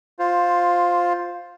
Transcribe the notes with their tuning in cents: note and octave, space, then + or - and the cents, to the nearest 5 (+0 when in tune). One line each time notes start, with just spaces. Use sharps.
F4 +10 C5 +0